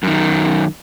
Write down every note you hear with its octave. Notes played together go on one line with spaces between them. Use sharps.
F#2 D#3